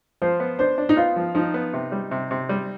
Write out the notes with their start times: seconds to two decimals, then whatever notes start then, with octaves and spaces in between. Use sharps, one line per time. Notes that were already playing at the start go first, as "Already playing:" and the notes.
0.22 F3 C5
0.40 B3
0.59 D4 C5
0.78 D4
0.89 D#4
0.97 B3 F4
1.16 F3
1.35 F3 D#4
1.54 B3
1.73 C3
1.92 G3
2.11 C3
2.31 C3
2.49 G3